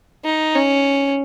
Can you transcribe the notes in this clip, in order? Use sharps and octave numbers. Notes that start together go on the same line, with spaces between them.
D#4
C#4